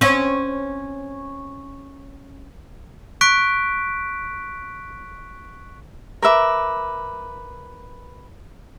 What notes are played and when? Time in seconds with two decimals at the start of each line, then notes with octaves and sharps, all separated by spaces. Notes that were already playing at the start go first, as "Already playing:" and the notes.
0.01 C4 C#4
3.21 C#6 F#6 B6 D7
6.22 A#4 B4 E5 D6